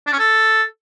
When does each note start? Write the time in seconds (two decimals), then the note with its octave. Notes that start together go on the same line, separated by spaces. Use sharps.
0.07 D4
0.13 C#4
0.19 A4